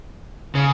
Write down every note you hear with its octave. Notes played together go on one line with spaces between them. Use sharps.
C#3